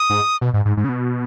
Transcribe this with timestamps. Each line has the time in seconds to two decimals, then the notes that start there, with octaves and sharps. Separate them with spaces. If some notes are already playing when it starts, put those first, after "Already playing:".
Already playing: D#6
0.10 G#2
0.41 B2
0.54 G#2
0.65 G#2
0.77 G#2
0.84 C#3
0.89 B2